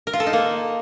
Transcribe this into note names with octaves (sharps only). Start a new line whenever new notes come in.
A#4
F4
A4
D#4
A#3